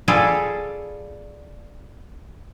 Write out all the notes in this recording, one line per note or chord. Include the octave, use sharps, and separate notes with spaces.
G3 F4 G#4 A4